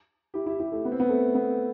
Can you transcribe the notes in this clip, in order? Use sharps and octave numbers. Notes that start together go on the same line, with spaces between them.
E4 G4
E4 G4
E4 G4
A3
B3
C4
B3
A3
B3